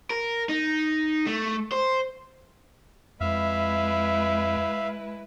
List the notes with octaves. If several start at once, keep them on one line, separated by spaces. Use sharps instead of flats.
A#4
D#4
A3
C5
F2 G#3 E4 B4 E5 F5